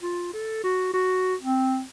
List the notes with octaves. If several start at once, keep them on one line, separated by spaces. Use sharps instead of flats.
F4
A4
F#4
F#4
C4